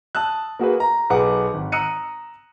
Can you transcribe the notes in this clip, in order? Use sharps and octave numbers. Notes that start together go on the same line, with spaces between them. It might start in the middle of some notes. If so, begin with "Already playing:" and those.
A5 D#6 E6 F#6
A#3 F#4 G#4 B4
A#5
B1 G#4 B4 F#5 D6
G#1
A#5 D#6 E6 F#6 C#7 D#7